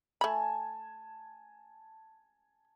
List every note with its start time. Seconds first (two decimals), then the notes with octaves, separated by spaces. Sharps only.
0.21 A3 G#5 A5 B5